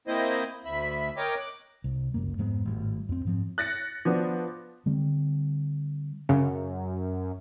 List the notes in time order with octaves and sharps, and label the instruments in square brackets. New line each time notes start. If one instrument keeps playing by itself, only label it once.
[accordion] A#3 C4 E4 C5 D#5
D2 E5 B5
A#4 C#5 D#5 G5 D6
D6 F#6
[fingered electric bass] C2
G1 C#2 F#2 A#3
F2 G#2 G#3 B3
G#1 A2 G3
F2 C4
G#2 F3 C4
[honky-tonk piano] F#6 A6 A#6 C#7
F3 B3 D4
[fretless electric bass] D3 G3 C4
[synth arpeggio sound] F#2 [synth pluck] C#3